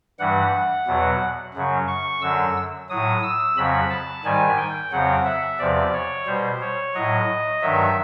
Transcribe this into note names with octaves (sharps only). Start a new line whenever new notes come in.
G2 E3 G3 F#5
E2 B2 F#3
F#2 C#3 F#3
C#6
F#2 D3 F#3 E6
A2 F#3 D#6
E6
F2 C#3 F#3 B5
A5
G#2 D#3 G3 G#5
G5
F2 C#3 F#3 F#5
E5
E2 C3 F3 D5
C#5
B2 G3 C5
C#5
A2 F#3 D#5
G2 D#3 F#3 E5